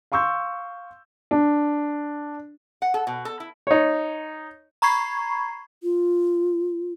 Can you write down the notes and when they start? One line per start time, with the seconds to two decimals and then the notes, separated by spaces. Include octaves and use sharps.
0.12 F5 C6 C#6 E6 G6
1.31 D4
2.82 F#5
2.94 A4
3.07 B2
3.25 A4
3.40 E4
3.67 D#4 C#5
4.82 A#5 B5 C#6 G#6 C7
5.83 F4